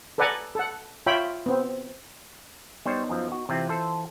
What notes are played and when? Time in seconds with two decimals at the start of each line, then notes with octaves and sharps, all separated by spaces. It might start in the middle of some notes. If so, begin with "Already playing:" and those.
0.18 A4 B4 D5 F#5 G#5 A#5
0.55 A4 F#5
1.06 F4 C#5 E5 G5 B5
1.46 B3 C4
2.86 G3 B3 D#4 C5 C#5
3.09 F#2 F3
3.32 F#4
3.49 C3 E3 C4 E4 F4
3.69 A4 C5